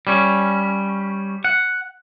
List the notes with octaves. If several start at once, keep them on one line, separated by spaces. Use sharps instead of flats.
G3 C#4
F#5